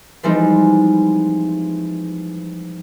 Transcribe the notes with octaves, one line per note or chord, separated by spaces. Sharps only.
E3 F3 G3 G#3 C4 D#4